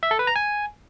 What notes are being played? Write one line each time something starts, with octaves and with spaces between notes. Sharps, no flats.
E5
A4
B4
A#5
G#5